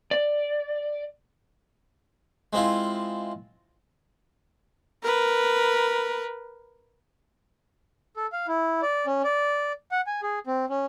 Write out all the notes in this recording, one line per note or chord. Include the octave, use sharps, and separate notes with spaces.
D5
G#3 C4 E4 F4
A#4 B4
A4
F5
E4
D5
C#4
D5
F#5
G#5
G#4
C4
C#4